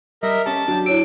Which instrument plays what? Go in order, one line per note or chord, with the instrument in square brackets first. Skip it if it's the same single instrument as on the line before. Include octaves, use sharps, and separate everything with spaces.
[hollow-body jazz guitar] G3 [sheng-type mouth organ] A#4 D#5 E5
[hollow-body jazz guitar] C#4 G4 A4 [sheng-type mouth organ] A5
[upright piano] F#3 [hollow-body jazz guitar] D4 G4
[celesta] E4 C#5 D7 [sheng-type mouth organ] E6